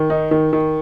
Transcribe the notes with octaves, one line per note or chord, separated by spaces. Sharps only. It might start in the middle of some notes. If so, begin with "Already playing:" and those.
Already playing: D#3
D#4
D#3
D#3